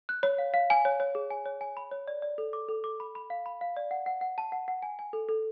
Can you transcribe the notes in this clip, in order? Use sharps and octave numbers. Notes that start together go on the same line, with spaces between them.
F#6
C#5
F5
F5
G#5
C#5
C#5
G#4
G#5
C#5
G#5
B5
C#5
D5
D5
A4
D6
A4
D6
B5
B5
F5
B5
F5
D5
F#5
F#5
F#5
A5
F#5
F#5
G#5
G#5
A4
A4